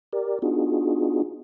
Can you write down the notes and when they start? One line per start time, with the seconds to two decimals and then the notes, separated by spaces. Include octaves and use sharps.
0.13 G4 A#4 D5
0.42 B3 D4 D#4 F4 F#4 G#4